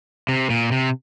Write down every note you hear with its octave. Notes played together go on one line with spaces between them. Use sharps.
C3
A#2
C3